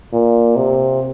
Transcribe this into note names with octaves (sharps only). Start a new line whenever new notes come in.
A#2
C3